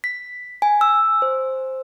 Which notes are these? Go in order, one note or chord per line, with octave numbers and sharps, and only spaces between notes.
B6
G#5
E6
C5